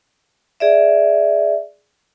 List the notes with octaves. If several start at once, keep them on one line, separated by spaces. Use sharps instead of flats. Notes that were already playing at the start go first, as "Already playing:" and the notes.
G#4 D5 E5